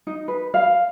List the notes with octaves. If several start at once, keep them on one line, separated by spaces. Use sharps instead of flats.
D#4
B4
F5